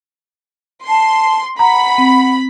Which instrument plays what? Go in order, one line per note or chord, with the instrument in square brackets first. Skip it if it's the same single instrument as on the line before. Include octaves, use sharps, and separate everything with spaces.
[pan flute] A5 [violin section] C6
[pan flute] F#5 [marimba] A#5 [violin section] B5
[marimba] C4